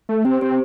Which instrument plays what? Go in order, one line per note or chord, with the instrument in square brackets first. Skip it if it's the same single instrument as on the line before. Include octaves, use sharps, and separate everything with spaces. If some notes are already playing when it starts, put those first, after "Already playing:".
[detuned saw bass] A3
[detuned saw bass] C4 [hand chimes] G4 C5
[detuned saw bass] C4 [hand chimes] G4 C5